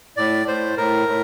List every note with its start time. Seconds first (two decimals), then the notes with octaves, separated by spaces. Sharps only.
0.17 A2 D5
0.47 A2 C5
0.77 A2 A#4
1.08 A2